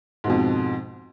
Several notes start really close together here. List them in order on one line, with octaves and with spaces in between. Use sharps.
G#2 B2 F2